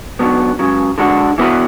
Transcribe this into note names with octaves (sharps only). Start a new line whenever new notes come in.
C#2 B2 F#3 B3 D4
C#2 C#3 F#3
D3 G#3 D4 F#4
E3 B3 F#4 B4